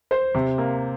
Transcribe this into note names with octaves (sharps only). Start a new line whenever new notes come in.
C5
C3
A#3